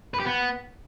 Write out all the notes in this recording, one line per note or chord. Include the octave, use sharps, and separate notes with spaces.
B4
G4
B3